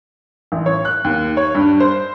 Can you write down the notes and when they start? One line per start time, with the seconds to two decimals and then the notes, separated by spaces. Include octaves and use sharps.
0.52 A1
0.66 C#5
0.85 F#6
1.04 D#2
1.37 C#5
1.55 G2
1.80 C5